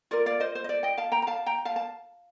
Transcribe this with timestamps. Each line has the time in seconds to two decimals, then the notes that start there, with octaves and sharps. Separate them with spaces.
0.11 F4 A#4 D5
0.26 D5 F5
0.40 C5 D#5
0.55 C5
0.64 D#5
0.69 D5
0.83 D#5 G5
0.97 F5 A5
1.12 G5 A#5
1.22 A#5
1.27 F5 A5
1.46 G5 A#5
1.65 F5 A5
1.76 A5